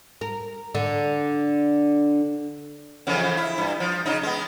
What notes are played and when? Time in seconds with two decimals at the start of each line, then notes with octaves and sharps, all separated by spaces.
0.21 A#4
0.75 D3
3.07 F2 C#3 E3
3.37 E4
3.58 G2 E4
3.80 F3
4.06 C#3 D#4
4.23 G#3 B3